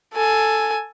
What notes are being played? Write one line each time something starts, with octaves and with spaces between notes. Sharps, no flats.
A4 G#5